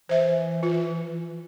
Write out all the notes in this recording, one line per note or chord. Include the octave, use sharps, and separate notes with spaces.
E3 C5 E5
F4